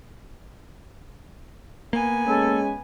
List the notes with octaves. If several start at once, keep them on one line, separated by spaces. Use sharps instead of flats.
A#3 B3 G#5
G#3 C#4 A4